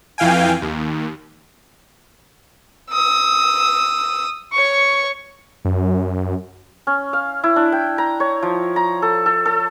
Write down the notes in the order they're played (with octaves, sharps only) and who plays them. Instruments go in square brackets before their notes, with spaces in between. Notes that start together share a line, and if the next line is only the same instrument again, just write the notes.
[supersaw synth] F2 E3 F5 G5 G#5
D#2
[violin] D#6 E6
C#5 C#6
[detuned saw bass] F#2
[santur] C#4
F5
E4
D4
G5
A#5
C#5
F3
A#5
A4
A4
A4